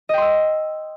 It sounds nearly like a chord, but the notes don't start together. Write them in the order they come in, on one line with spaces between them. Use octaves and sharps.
D#5 G5 C6 E6